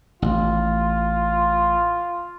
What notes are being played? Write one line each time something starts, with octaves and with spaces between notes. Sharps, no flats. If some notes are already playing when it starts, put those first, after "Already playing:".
A1 F4